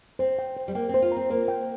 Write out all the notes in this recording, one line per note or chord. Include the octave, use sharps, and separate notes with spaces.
C4 C5
G5
C5
G3
A#3 G5
C4 C5
F4
C4 A#5
A#3 C5
G5